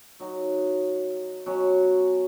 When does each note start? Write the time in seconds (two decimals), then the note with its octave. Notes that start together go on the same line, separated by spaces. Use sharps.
0.20 F#3 D#4 F#4
1.46 B2 F#3 C#4